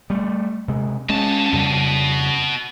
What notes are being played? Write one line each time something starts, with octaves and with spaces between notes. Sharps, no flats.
G3 A3
C3 G#3
B2 G#3 C#4 A5
F2 C#3 G3